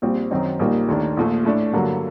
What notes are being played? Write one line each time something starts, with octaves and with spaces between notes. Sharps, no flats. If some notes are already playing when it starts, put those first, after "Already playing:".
A#1 A#2 G3 C4
F#2 D#3 F#3 C4 D#4
A#1 A#2 G3 A#3 D#4
D#2 D#3 A3 D4
A#1 A#2 A3
A2 A3 D4
G2 D3 F#3 A#3